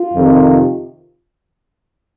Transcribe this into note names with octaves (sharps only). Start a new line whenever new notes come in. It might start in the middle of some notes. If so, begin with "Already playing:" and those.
Already playing: F4
F2 C3 D#3